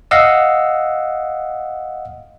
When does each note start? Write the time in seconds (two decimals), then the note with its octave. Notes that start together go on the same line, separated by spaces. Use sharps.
0.11 D#5 F5 F#5 E6